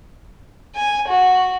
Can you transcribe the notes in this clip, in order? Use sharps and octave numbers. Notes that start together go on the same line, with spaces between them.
G#5
F#4